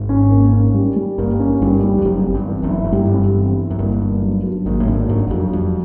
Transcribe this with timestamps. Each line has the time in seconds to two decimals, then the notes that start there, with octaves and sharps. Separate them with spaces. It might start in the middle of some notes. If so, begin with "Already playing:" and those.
Already playing: G#1 G#2
0.09 C#4
0.31 A#3
0.53 C#4
0.74 G3
0.96 G3
1.18 G1 G2 A#3
1.39 C#4
1.61 G1 G2 G3
1.83 G3
1.98 F2
2.05 F#1 F#2 G3
2.27 C4
2.34 G1 G2
2.49 E3
2.63 F#1 F#2
2.70 E4
2.84 F#2
2.92 G1 G2 G3
3.13 C4
3.35 E3
3.57 E4
3.70 F#2
3.79 G1 G2 A#3
4.00 D4
4.22 F#3
4.44 F#3
4.66 G#1 G#2 A#3
4.80 A2
4.87 G#1 G#2 D4
5.09 F#1 F#2 F#3
5.31 F2 F#3
5.53 F2 G3